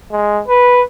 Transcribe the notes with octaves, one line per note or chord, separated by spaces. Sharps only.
G#3
B4